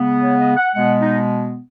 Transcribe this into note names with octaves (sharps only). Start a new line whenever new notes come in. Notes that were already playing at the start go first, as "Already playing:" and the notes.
Already playing: C#3 G#3 B3
C#5
D#5
F#5
B2 G#3 B3 F#5
D#4